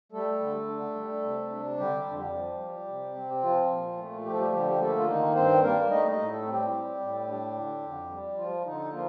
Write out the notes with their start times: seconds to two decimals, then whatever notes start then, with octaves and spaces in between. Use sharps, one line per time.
0.12 G3 A3 A4
0.40 D3
0.68 D4
0.95 G3
1.23 C3
1.50 D4
1.77 D3 G3 G4
2.06 F2
2.19 G3 G4
2.32 F3
2.60 G3
2.87 C3
3.15 C4
3.43 F3 F4
3.70 A#2
3.97 A3
4.25 F3 G4
4.33 A4
4.39 G3 G4
4.53 D3 G3 G4
4.71 G4
4.80 A3 A#3 A4
4.98 F4
5.08 D#3 D#4
5.35 G2 C4 C5
5.62 G3 A#3 A#4
5.90 A3 D#4 D#5
6.11 D#4 D#5
6.18 A2
6.31 A3 A4
6.45 C4
6.52 G3 G4
6.73 G3
7.00 A2
7.28 D4
7.55 D3
7.82 F2
8.10 G3
8.38 F3 F4
8.65 D3 D#4
8.93 F3 A#3 F4